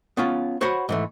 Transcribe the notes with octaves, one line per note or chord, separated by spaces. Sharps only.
B3 C#4 F4
F#4 C5 C#5 F#5 B5
G#2 E3 A3